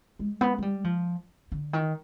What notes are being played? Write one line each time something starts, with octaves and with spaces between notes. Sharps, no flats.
G#3
B3
G#3
G3
F3
D3
D#3